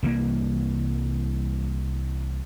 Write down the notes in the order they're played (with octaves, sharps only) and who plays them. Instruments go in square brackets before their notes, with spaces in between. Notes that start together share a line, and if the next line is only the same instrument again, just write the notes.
[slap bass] C2 E3 G3 A#3